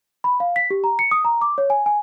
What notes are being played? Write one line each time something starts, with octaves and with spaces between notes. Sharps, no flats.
B5
F5
B6
G4
A#5
C#7
D#6
A#5
D6
C#5
G#5
G#5